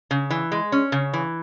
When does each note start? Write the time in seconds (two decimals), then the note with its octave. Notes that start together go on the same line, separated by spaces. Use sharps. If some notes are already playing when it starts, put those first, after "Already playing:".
0.11 C#3
0.30 E3
0.52 G#3
0.72 C#4
0.92 C#3
1.13 E3